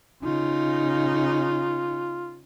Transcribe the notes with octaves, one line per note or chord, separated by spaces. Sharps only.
C#3 D#4 F4